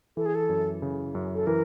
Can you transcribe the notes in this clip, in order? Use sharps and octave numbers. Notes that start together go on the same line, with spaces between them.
E3 A4
G#4
A4
F#2
C#3
F#2
A4
E3 A#4